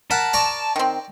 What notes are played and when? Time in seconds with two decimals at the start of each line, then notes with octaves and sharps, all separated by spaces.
0.11 A#4 F#5 A5 B5
0.33 D5 A#5 C#6
0.76 D#3 C4